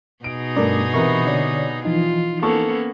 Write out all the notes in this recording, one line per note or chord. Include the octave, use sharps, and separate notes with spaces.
B2 D#4 G#4 D7
G2 A3 A#4 D5
C3 E3 B3 A#4 B4 C#6
D3 C#5 D5
E3 F3 D#4 F4
A#3 B3 C#4 A4 C#6